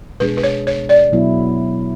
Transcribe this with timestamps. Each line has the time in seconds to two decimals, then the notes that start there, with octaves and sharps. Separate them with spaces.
0.20 B2 G#3 D4 G#4 B4
0.37 B4
0.43 C#5
0.67 C#5
0.89 D5
1.12 B2 F#3 B3 E4